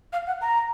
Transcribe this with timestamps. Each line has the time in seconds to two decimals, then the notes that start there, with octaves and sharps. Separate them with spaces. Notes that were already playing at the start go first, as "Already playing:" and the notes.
0.13 F5
0.27 F#5
0.41 A#5